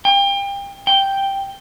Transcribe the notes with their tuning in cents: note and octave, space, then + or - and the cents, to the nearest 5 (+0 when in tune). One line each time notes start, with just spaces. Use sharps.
G5 +30
G5 +0